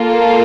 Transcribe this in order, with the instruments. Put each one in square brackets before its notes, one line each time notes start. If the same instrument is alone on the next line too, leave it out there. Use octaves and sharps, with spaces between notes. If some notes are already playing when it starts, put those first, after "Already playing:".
Already playing: [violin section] A#3 F4 A4